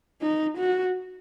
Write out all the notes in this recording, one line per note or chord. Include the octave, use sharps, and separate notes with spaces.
D#4
F#4